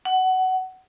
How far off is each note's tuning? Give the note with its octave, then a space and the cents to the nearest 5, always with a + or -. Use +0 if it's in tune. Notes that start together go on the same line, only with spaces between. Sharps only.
F#5 +20